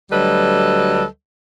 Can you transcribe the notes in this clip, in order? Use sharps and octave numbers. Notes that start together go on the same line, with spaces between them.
D2 F#3 G3 A4 B4 D#5